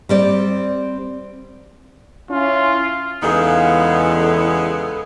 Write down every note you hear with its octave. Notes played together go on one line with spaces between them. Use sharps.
G3 C4 D5
C#4 E4 F4
E2 C#3 G#3 B3 D#4 G#4 A4 F5